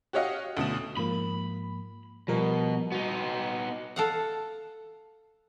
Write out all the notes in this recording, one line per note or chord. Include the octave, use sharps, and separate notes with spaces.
F#4 G4 C#5 D#5 F5 F#5
D2 B2 D3 E7
G#2 F3 A#3 B5
B2 F3 G3 A#4
B3 D#4 F#4
A4 F5 F#5